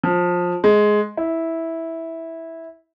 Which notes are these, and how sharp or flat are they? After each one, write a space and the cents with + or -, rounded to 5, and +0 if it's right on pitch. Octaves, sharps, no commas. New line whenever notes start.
F3 +20
G#3 +10
E4 -10